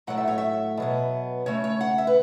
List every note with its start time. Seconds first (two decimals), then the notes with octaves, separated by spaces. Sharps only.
0.07 A2 F#3 A3 F#5
0.18 E5
0.28 C#5
0.38 E5
0.77 B2 F#3 B3
1.46 C#3 A3 C#5
1.64 C#5
1.81 F#5
1.98 E5
2.07 B4